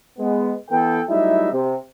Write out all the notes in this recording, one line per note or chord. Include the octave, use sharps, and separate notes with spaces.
G#3 B3
E3 B3 A4 G5
F#3 G3 A3 D#4 E4 E5
C3